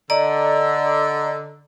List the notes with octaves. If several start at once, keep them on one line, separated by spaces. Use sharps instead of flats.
D3 D5 D#5 A#5